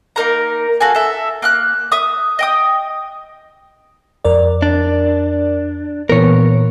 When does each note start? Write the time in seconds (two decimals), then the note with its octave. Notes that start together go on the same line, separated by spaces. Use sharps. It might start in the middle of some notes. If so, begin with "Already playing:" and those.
0.16 A#3 D#4 A#4 A#5
0.81 F#4 A4 F5 G#5
0.95 A4 E5
1.42 A#3 F6 F#6
1.92 E5 D#6
2.39 D#5 G5 D#6
4.25 F2 A#4 D5
4.62 D4
6.09 A#2 E3 B3 A#4 C#5